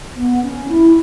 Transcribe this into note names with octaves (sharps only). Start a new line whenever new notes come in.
B3
C#4
E4